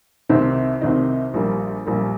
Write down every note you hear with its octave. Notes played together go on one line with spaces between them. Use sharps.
C2 C3 D#3 C4 D#4
C2 C3 D#3 C4 D#4
A#1 A#2 G3 A#3
A#1 A#2 G3 A#3